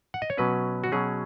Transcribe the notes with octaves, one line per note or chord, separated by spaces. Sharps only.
F#5
D#5
C#5
B2 F#3 C#4 B4
F#4
B2 F#3 C#4 G#4